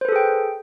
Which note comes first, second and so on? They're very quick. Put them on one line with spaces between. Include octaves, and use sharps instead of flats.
C5 B4 A4 G#4 G5